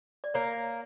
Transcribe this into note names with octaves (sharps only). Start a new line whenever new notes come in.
D5
A#3 C#5